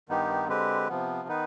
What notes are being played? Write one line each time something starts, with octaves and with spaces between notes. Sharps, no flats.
G2 D#3 B3 D#4 G4
D3 G#3 C4 G4 B4
C3 F3 B3
D#3 B3 D#4 B4